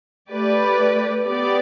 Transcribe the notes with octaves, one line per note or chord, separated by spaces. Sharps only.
A3 G4 B4 D5
B3 G4 D5